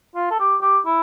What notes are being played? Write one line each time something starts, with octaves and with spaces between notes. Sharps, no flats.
F4
A4
G4
G4
E4